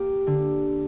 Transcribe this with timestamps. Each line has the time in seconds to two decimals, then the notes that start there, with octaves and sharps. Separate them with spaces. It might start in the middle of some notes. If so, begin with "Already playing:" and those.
Already playing: A#3 G4
0.27 D3